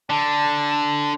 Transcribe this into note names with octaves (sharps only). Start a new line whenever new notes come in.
D3 A5